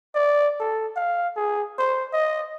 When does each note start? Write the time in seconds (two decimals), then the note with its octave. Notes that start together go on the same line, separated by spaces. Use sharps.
0.15 D5
0.60 A4
0.96 F5
1.36 G#4
1.79 C5
2.13 D#5